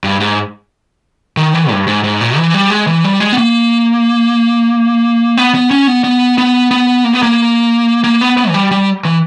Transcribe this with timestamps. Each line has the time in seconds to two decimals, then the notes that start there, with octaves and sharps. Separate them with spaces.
0.04 G2
0.20 G#2
1.37 D#3
1.54 E3
1.71 G2
1.87 G#2
2.04 G#2
2.21 A#2
2.37 E3
2.54 G3
2.70 G#3
2.87 E3
3.04 G3
3.20 G#3
3.32 B3
3.38 A#3
5.37 B3
5.54 B3
5.71 C#4
5.87 B3
6.04 B3
6.38 B3
6.71 B3
7.04 A#3
7.13 B3
7.23 A#3
8.04 A#3
8.21 B3
8.37 B3
8.49 E3
8.54 G3
8.71 G3
9.05 E3